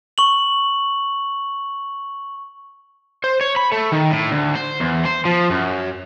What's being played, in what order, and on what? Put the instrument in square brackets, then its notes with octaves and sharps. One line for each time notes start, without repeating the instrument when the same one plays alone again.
[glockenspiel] C#6 F#7
[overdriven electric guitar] C5
C#5
B5
A3
D#3
A2
D2
C5
E2
C5
F3
F#2